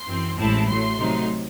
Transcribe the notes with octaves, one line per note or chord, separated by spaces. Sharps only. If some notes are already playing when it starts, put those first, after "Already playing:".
Already playing: C6
F#2 E3 C4
A1 A2 G#3 C4 E4 A5
A2 F#3 A3 C6
C3 F#3 A3 D#4